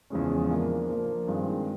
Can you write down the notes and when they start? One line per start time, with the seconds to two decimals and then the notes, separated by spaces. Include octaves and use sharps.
0.10 E2 C#3 F3 G#3 C#4
0.50 F3 A#3 D4
0.89 F3 A#3 D4
1.27 G2 D#3 G#3 C4 F4